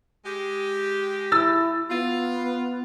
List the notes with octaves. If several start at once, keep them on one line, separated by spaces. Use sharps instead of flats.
G#3 G4
E4 E6 A6
B3 F4